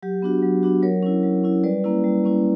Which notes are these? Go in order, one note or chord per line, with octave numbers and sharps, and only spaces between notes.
F#3 G4
B3 D4 F#4
F#3
B3 D4 F#4
F#3 A#4 C#5
C#4 E4
F#3
C#4 E4
G3 B4 D5
A#3 C#4 E4
G3
A#3 C#4 E4